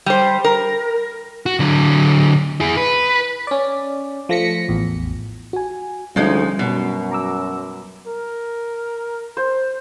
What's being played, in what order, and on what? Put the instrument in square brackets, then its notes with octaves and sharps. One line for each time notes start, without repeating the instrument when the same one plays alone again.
[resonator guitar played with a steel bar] G3 C5
A#4
[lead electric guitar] F#4
D3 F#3
E4 G#4
B4
[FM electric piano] C#4 D5
F3 A3 A#6 B6 C#7
A1 E2
F#4 G#5
[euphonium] D2 [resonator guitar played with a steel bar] F3 G#3 D#4 [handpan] G3 [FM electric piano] C#4
[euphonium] F#2 [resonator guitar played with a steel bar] B2
[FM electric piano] A#5 D6 E6
[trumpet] A#4
[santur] C5